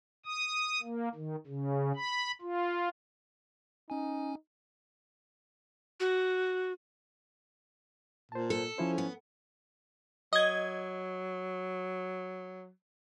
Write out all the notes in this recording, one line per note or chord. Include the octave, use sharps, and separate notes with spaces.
D#6
A#3
D#3
C#3
B5
F4
C#4 D#4 G#5
F#4
A#2 C5 A5
A4
F3 C#4 E4 C5
B3
F#3 D#5 G#6